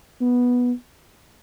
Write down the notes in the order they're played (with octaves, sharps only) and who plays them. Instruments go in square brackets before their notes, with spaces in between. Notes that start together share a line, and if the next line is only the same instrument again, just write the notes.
[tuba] B3